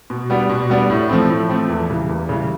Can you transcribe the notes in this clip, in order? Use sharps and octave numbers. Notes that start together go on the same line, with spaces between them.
B2
G3 B3 D4
B2
G3 B3 D4
A2
F3 A3 C4
A2
F3 A3 C4
E2
C#3 E3 G3
E2
C#3 E3 G3